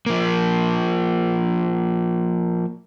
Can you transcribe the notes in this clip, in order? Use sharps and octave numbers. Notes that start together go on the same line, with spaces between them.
F3 A#3